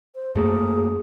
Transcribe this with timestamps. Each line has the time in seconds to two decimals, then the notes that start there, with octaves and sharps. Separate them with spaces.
0.15 C5
0.36 F#2 A3 A#3 G#4